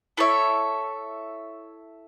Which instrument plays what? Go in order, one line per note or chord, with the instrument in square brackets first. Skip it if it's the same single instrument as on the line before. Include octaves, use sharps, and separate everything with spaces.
[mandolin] E4 A4 C#5 E5